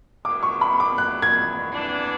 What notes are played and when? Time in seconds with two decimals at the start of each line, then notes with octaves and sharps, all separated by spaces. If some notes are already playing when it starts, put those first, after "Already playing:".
0.25 F#2 E3 G#3 D6
0.43 C#6
0.61 B5
0.80 D6
0.98 F#6
1.22 G#6
1.72 E3 B3 D4